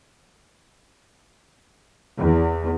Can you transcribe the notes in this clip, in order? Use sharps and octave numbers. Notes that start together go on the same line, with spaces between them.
E2